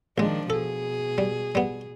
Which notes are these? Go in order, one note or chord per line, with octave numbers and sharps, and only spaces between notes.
A#1 D#3 F3 G#3 D4
B2 G#4 A4
G3
G3 B3